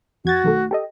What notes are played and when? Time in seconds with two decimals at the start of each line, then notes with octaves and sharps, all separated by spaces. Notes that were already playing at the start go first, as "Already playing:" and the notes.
0.25 F2 F#4 G#6 A6
0.44 B1 D#3 A3
0.71 G4 A4 D#5